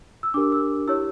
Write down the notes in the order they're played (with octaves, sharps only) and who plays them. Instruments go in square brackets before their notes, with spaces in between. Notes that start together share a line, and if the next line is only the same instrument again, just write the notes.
[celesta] E6
D4 G4 A#4 D6
E6
E4 G4 C#5 E6